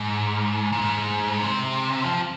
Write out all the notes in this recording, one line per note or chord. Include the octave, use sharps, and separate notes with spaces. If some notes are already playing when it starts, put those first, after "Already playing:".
Already playing: G#2
A#2
G#2
C3
F3